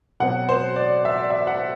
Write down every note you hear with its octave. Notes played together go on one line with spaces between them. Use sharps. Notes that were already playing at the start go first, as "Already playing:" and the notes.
B2 F#3 C4 F#5
C5
D5
E5
D5
E5
F#5